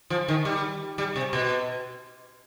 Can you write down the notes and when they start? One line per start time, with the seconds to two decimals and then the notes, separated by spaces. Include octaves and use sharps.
0.10 F3
0.28 D#3
0.45 G3
0.98 G3
1.16 C3
1.33 B2